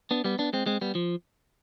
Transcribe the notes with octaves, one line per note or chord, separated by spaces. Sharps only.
B3 D4
G3 B3
B3 D4
G#3 C4
G#3 C4
G3 B3
F3